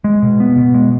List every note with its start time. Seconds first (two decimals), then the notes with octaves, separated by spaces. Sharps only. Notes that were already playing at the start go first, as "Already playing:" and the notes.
0.04 G#3
0.23 B2
0.40 B3
0.57 B2
0.74 G#3